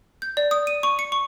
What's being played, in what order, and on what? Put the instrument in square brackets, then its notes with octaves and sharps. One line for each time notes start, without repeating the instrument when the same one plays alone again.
[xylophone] G6
D5
D#6
D#7
C#6
C#7
C#6